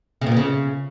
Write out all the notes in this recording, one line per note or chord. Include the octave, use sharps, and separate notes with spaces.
C#3
A#2
B3
C#3